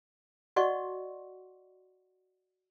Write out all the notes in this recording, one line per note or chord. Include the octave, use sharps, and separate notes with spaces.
F#4 D5 D#5 F#5 C6 C#6